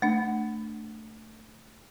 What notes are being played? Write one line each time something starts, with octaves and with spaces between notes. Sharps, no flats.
A3 D4